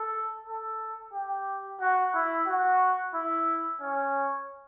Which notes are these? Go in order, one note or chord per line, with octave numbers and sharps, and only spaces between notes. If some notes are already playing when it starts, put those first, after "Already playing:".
Already playing: A4
A4
G4
F#4
E4
F#4
E4
C#4